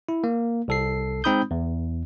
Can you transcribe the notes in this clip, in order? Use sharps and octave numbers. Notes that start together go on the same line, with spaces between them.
E4
A#3
C2 A4 C7
G#3 C4 D#4 B5 D#6 G6
E2